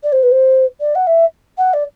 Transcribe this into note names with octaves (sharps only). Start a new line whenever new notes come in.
D5
C5
B4
C5
D5
F#5
E5
F#5
D5